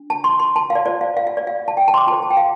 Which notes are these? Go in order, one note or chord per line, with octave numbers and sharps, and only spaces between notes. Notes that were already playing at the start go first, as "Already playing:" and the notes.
Already playing: D4
A5
C6
C6
A5
F5
D5
F4 C5 D5
F5
F5
F5
D5
F5
A5
G5
A5
C6
D6
F4 A4 C5 A5
A5
G5
F5